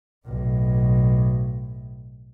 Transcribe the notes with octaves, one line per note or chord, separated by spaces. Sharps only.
B1 A2